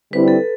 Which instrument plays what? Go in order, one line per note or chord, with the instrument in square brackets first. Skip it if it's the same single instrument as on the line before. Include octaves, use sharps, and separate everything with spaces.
[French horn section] D3 G3 C4 E4 [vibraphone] B4
[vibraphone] A4